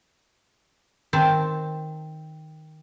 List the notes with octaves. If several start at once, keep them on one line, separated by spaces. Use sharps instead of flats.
D#3 C4 A5